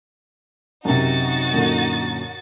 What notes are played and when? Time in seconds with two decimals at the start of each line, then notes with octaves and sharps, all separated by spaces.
0.85 F#2 C3 D#4 F#4 A6
1.54 F#2 A#2 D3